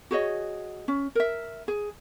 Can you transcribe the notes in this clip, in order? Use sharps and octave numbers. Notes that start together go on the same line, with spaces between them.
F#4 G#4 C#5 D#5
C#4
A#4 E5
G#4